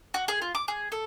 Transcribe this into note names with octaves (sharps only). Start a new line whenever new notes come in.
F#4
G#4
F4
D6
G#4
A4